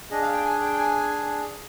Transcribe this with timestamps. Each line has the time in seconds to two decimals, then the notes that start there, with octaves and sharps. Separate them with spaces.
0.11 D4 G#4 D#5
0.22 F5
0.33 G5
0.44 G#5
0.61 G5
0.73 G5
0.78 G#5